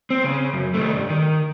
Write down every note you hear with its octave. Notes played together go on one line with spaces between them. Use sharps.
C4
C#3
F#2
C2 A3
D2 G2
D#3